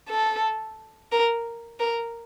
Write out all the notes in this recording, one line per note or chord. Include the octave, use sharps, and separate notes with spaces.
A4
A#4
A#4